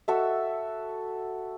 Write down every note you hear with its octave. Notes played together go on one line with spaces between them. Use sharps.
F#4 A4 E5